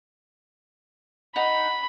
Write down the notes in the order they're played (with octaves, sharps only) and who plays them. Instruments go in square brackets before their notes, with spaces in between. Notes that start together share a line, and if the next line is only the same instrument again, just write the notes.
[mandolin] D#4 F#5 [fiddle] B5